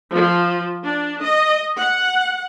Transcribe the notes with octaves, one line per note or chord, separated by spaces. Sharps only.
F3
D4
D#5
F#5